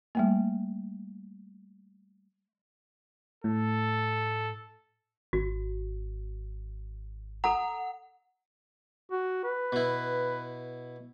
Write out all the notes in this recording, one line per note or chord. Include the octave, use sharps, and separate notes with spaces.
G3 A3 A#3
A2 A4
G#1 F#4
A4 F#5 A#5
F#4
B4
B2 E4